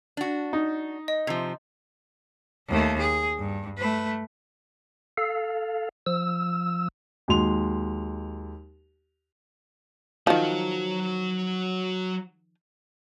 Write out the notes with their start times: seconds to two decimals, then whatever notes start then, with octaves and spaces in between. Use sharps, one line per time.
0.17 D4 F#4
0.53 D#4
1.08 D#5
1.27 C3 F3
2.69 D#2 A3
3.00 G#4
3.39 G2
3.78 A3 B4
5.18 A4 F5
6.06 F3 E6
7.28 D#2 F#3 G#3 C6 F7
10.27 D#3 F3 F#3 F#4